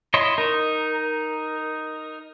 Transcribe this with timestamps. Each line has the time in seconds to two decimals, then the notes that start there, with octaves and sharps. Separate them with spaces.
0.14 E4 C#5 D#5 C6
0.38 D#4 A#4